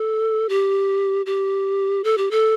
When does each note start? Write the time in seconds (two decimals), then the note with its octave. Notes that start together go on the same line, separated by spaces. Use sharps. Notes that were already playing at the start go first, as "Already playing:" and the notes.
Already playing: A4
0.49 G4
1.26 G4
2.04 A4
2.18 G4
2.31 A4